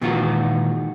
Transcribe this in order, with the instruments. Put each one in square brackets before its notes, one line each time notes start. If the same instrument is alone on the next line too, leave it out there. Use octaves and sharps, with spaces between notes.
[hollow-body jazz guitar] A#2 D#3 E3 G#3 F4 F#4